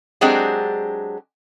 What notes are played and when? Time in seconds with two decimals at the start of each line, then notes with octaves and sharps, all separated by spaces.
0.21 F#3 G#3 C4 D4 G4 G#4